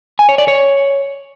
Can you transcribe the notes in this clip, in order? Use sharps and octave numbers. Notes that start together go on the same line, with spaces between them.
G#5
C#5
D5
C#5